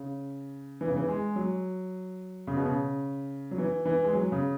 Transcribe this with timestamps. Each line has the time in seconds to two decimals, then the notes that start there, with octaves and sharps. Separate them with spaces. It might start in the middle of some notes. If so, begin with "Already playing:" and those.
Already playing: C#3
0.81 E3
0.88 C#3
0.96 E3
1.08 G#3
1.36 F#3
2.47 C#3
2.56 B2
2.66 C#3
3.51 F#3
3.58 E3
3.85 E3
4.04 G#3
4.13 F#3
4.32 C#3